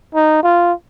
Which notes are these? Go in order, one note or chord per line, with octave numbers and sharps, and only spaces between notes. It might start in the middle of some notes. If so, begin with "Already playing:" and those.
D#4
F4